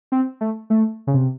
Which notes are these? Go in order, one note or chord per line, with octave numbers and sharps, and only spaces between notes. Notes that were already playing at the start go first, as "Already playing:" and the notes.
C4
A3
A3
C#3
C3